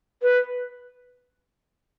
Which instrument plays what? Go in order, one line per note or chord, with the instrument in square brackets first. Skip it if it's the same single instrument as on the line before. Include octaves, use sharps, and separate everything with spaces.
[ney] B4